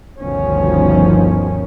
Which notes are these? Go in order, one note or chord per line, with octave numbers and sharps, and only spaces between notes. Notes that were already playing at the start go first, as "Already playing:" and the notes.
G1 D2 B2 D#3 F3 C#4